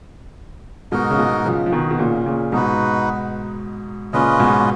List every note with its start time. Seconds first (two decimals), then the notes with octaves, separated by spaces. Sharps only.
0.92 G#2 B2 D#4 F#4 A#4 D#5
1.10 C#3
1.19 G#2 B2
1.45 C#3 F3
1.66 F3
1.72 B2 D#3
1.91 B2
1.99 A#2 C#3
2.26 A#2 C#3
2.52 G#2 B2 D#4 F#4 B4
4.13 A#2 C#3 C#4 F4 B4 D#5
4.40 G#2 B2